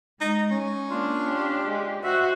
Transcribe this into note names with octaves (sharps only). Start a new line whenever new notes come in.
G#3 D#4
C#4
A#3 D4 F4
G4
G#3
F#4 C5 E5